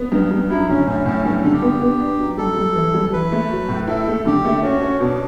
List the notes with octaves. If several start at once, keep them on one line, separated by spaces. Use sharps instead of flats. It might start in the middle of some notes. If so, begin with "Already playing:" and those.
Already playing: B3
G2
G2
F#2 E4
D3 C#4
A2 C#4
A2 C#4
G2 C#4
D3 A4
G4
B3
B3
D4
F#2
G3 A4
G3
E3
G3
E3 B4
A3
F#3
A2
E4 A4
A3
D3 G4
A3
C#4 F#4
C#4
B2 D4